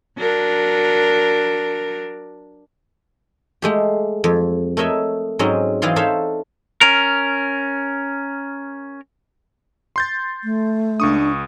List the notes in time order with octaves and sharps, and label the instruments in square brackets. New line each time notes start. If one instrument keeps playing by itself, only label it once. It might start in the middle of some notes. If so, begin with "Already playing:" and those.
[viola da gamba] F#3 D4 A#4
[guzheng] G#3 A3 G4
F2
A3 A#4 C#5 D#5 E5
G#2 F#3 G#3 C4 C#4 D#5
E3 C4 G#4 D5 F5 C6
D#4 A4 C5 C#5 E5 F5
[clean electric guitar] C#4 A#4
[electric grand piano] C6 G6 A6
[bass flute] A3
[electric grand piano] C#2 C#6 D#6 [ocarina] D4